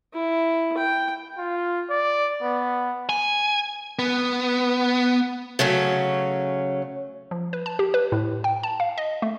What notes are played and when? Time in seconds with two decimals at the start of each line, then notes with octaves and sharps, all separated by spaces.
0.13 E4
0.77 G5
1.37 F4
1.90 D5
2.42 B3
3.09 G#5
3.99 B3
5.59 C#3 F#3 A3 C#4
7.31 F3
7.53 B4
7.66 A5
7.79 G4
7.94 B4
8.12 A2
8.44 G5
8.63 A5
8.80 F5
8.98 D#5
9.22 A3